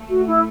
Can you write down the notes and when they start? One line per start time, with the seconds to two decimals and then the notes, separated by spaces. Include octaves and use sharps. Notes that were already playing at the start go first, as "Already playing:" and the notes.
Already playing: A3
0.09 F#4
0.27 E4